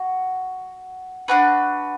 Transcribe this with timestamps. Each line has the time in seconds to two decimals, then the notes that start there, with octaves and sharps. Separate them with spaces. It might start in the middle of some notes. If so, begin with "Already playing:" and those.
Already playing: F#4
1.28 D4 F#4 B4